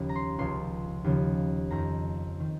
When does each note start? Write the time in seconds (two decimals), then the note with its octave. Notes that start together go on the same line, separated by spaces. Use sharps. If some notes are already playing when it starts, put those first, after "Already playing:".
Already playing: D#2 C#3 F3
0.09 A#5
0.16 C6
0.38 C#2 C#3 F3 C6
1.04 D#2 C#3 F3
1.71 F2 D#3 A#5
2.40 D#3